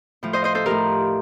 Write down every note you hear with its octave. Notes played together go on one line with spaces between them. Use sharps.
A2 F3
C5 D#5
C5 D#5
A4 C5
A2 F3 G4 A#4